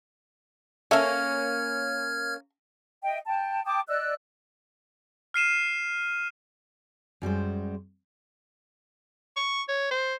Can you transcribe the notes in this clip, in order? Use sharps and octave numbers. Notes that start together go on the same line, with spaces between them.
A#3 C#4 A4 E5 F6 G#6
D#5 E5 G5
G5 A5
G5 A5 D6 D#6
D5 D#5 E6 F#6
F6 C7 D#7 E7
F#2 G3 G#3 C5
C#6
C#5
C5